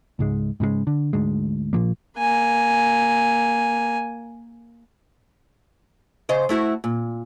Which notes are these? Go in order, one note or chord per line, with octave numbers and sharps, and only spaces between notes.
C#2 G#2 G#3
G#2 C#3 F3 G#3
D3
D2 G#2 G#3
A#1 A#2 F3 A#3
A#3 G#5
C#3 C5 D#5
A3 E4 F#4
A#2